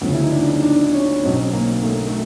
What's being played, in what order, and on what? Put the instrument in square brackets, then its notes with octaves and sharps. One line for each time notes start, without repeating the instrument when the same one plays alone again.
[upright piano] D2 C#3 F3 B3
E4
D#4
D4
D#4
D4
C#4
B1 B2 F#3 C4
A#3
A3
A3